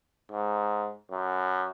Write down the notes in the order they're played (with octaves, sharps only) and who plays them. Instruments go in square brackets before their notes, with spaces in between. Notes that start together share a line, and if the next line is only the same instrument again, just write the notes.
[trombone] G#2
F#2